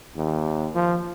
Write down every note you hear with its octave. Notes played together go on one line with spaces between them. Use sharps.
D#2
F3